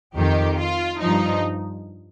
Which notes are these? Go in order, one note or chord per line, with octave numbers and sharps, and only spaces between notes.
F2 D#3 G4
F4
G2 F3 D#4